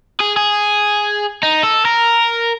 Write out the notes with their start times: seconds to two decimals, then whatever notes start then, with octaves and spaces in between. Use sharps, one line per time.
0.20 G#4
0.37 G#4
1.43 D#4
1.63 A4
1.85 A#4